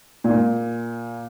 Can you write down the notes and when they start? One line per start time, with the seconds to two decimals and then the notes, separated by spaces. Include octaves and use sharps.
0.24 A#2